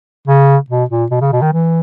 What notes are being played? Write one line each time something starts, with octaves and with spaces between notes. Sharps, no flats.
C#3
B2
A#2
B2
C#3
B2
D#3
E3